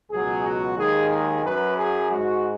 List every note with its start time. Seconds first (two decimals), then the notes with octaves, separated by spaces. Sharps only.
0.10 C#2 B2 F#3 G#4
0.44 F#4
0.77 D#2 D#3 G#3 G#4
1.10 G#4
1.44 F#2 F#3 B4
1.77 G#4
2.11 G#2 G#3 F#4